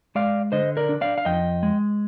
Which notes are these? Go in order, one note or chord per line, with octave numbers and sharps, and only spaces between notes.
G#3 D5 F5
D3 C5 D#5
A#4 D5
D4
D5 F5
F5
F2 D#5 G5
G#3